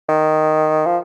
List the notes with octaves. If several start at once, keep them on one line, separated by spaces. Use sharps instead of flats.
D#3
F3